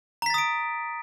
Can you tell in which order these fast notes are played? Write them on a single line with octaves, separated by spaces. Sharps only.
A#5 B6 A6 D#6 D7